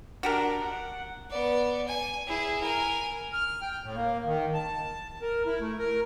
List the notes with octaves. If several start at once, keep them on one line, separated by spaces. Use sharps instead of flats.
D4 F#4 G4 A#4
F#5
B3 D5
G#5
E4 G#4
A#4 G#5
F6
G5
A2
A#3
D#3
A5
A#4
E4
A3
A#4